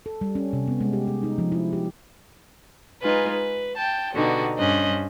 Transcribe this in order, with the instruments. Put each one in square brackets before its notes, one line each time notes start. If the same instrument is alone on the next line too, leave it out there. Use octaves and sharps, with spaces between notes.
[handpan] A4
G3
C#4
C3
B3
G#3
G4
G#4
D#4
F3
E4
G4
[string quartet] G#3 D#4 F4 B4 G#5
B4
G5 A5 G6
B2 D3 G3 B3 D#4 F#4
G2 G3 C#4 C5 D#5 F#6